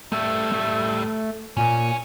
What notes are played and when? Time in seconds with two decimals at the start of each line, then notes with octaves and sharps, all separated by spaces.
0.12 A2 G3 A3 E6
0.52 A3
1.57 A#2 C#4 G#5